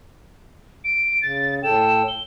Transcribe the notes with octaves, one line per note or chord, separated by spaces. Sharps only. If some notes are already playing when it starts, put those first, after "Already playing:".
D7
C#3 A6
A2 A4 G5 E7
G7